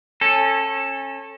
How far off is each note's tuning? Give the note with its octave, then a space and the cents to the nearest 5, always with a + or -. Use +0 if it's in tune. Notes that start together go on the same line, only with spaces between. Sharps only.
C#4 -25 A4 +5